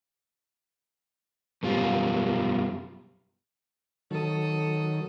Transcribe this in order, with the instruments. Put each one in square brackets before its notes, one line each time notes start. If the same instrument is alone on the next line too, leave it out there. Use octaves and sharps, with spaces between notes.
[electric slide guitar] F#2 B2 G3 F4
[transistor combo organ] D#3 F#3 [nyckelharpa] A4 D#6